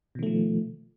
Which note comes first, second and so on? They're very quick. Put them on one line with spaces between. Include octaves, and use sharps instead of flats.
B2 D#3 A3 F3